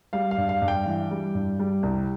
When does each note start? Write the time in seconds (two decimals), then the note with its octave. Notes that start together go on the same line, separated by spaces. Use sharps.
0.13 G3 F5
0.31 F5
0.38 G2
0.49 F5
0.62 G2
0.68 G5
0.86 E3
1.11 G3
1.35 G2
1.59 G3
1.83 C2